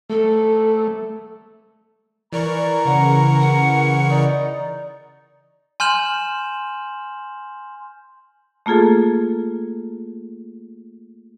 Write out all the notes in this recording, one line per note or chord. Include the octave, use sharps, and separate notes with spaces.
A3 A4
E3 A#4 D5 A#5 C#6
C#3 F#5
F#5
D#4 D5
G#5 C6 F6 G6 E7 F#7
A3 A#3 F4 G#4 A4